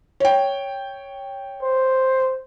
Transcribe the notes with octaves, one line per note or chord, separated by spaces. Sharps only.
C#5 G5
C5